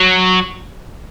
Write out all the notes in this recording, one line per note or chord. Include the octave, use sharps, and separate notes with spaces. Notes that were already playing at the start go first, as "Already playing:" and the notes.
Already playing: F#3